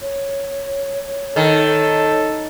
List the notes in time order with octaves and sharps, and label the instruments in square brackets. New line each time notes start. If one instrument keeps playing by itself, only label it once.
[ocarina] C#5
[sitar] D#3 [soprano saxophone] A4